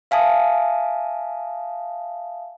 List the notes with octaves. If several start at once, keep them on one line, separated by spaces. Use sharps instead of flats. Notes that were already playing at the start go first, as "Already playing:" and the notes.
E5 F5 G#5 A5 D#6